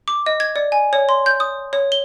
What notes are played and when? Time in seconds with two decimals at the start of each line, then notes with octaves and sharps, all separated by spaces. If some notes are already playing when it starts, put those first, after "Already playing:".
0.08 D6
0.26 D#5
0.40 G#6
0.56 D5
0.72 G#5
0.93 C#5
1.09 C6
1.26 G6
1.40 D#6
1.73 C#5
1.92 G7